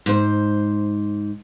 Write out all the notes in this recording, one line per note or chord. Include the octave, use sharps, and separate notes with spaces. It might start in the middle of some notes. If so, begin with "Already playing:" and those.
G#2 C5